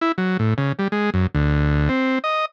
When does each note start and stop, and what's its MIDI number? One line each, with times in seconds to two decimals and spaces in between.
0.01 0.12 64
0.18 0.37 54
0.39 0.54 45
0.58 0.73 49
0.79 0.88 55
0.92 1.10 56
1.14 1.27 42
1.35 1.89 38
1.89 2.19 60
2.24 2.45 75